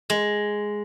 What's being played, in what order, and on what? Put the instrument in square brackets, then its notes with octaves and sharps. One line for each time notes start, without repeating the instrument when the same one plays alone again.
[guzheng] G#3